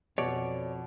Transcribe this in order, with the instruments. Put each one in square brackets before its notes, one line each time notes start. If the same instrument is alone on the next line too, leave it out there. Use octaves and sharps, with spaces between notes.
[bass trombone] F2 [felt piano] B2 [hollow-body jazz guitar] C#5 D5